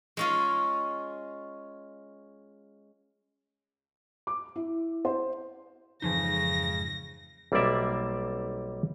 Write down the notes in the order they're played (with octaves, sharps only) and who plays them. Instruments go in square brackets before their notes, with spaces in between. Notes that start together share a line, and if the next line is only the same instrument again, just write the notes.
[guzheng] G#3 C#4 F4
[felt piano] D6
E4
C5
[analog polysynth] F2 G#2 [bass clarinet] C#3 [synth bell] E3 F3 D#4 [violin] A#6
[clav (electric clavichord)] B1 G3 A#3 C4 D5 E5